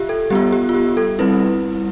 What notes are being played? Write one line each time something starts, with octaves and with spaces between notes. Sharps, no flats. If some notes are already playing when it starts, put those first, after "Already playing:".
Already playing: F4 G4 E5
A4
G3 B3 F4 G4
G4
F4
G4
A4
G3 C4 E4 B4